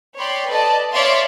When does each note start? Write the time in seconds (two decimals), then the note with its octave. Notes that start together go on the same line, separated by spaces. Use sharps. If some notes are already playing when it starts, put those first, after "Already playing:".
0.18 C#5 D5 G5 B5 C6
0.47 A4 B4 D5 D#5 A5
0.92 C#5 D5 E5 F5 C6